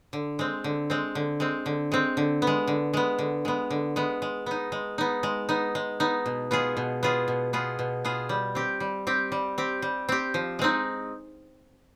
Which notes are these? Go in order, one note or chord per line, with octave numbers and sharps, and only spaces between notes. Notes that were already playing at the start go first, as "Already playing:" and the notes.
D3
G#3 C4
D3
G#3 C4
D3
G#3 C4
D3
G#3 C4
D3
B3
G#3
D3
G#3 B3
D3
G#3 B3
D3
G#3 B3
G#3
B3 D#4
G#3
B3 D#4
G#3
B3 D#4
G#3
B3 D#4
B2
B3 F4 G#4
B2
B3 F4 G#4
B2
B3 F4 G#4
B2
B3 F4 G#4
G3
C4 G4
G3
C4 G4
G3
C4 G4
G3
C4 G4
F3
G#3 C4 D#4